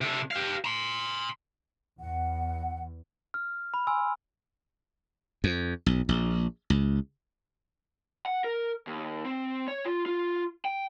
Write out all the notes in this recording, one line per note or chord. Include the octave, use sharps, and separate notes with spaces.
C3 A4
G4 F5
A#5 C6
E2 F#5
F6
B5
G#5 C6 E6
F2
B1
A#1
C#2
F#5
A#4
D#2
C4
C#5
F4
F4
G5